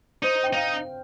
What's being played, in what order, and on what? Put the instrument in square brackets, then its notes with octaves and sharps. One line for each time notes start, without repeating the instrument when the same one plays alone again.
[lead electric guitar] D#4 [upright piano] C5
[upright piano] G5
[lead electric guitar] D#4 [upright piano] C5 F5